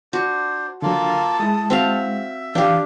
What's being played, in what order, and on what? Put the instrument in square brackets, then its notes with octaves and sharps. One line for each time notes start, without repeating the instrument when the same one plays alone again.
[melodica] D4 C5 [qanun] F#4
[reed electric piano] D3 F#3 [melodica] A#3 F4 [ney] A5
[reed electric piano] G#3 E4 [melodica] D#6
[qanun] C4 F#4 F5 [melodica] E5
[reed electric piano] E3 [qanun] D4 G4 [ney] F5